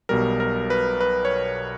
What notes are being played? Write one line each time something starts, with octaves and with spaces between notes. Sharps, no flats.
B1 B2 G3 A#4
A#4
B4
B4
C#5